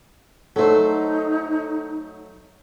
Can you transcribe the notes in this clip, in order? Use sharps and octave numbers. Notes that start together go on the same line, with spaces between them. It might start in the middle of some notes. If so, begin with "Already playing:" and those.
F#3 A3 D#4 A4 C5